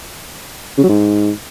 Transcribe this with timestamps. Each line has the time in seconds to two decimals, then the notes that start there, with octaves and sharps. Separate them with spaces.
0.78 C#3
0.84 F#3
0.89 G#2